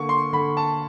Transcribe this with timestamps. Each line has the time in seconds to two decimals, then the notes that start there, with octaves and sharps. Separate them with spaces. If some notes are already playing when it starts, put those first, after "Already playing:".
Already playing: D3 A#3 C#6
0.09 C6
0.33 D3 B5
0.57 A5